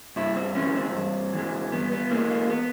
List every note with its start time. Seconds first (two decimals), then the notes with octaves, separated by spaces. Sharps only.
0.16 G2 E4
0.36 C4
0.55 E3 G#3 C#4
0.75 C4
0.94 G2
1.33 E3 G#3
1.72 G2 B3
1.92 B3
2.10 E3 G#3 A#3
2.30 A#3
2.50 B3